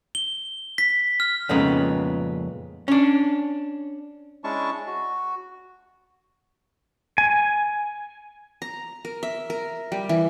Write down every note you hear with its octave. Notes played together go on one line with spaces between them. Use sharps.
G7
B6
F6
F2 A#2 C#3 G#3 B3 D#4
C#4 D4
G#3 C#4 D4 E4 A5 C#6
F#4
G#5
A#5
A#4
E5
A#4
G3
E3